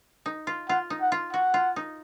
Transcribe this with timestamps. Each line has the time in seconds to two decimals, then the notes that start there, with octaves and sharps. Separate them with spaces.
0.26 D#4
0.47 F4
0.69 F4 F#5
0.90 D#4
1.01 F#5
1.12 F4
1.33 F#4 F#5
1.54 F4
1.76 D#4